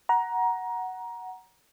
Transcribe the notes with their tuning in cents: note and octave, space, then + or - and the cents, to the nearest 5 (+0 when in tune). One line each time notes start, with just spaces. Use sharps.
F#5 +5 A#5 +20